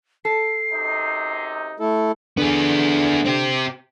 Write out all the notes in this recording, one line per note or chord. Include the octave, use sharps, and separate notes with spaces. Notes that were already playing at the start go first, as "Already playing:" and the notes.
A4 C7
F#2 C3 D#4
A3 E4 A4
D3 B3 G#4
C4 G4